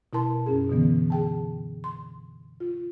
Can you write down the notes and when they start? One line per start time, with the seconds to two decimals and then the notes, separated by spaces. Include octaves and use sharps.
0.13 B2 E4 A#4 A5 C6
0.46 F#2 C#4 G#4
0.70 B2 D3 E3 B3
1.10 G#4 G5 A5
1.84 C6
2.60 F4